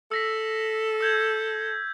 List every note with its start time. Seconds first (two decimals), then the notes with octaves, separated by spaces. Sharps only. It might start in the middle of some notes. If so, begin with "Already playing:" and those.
0.11 A4 E6 A#6 B6
1.01 E6 G6 G#6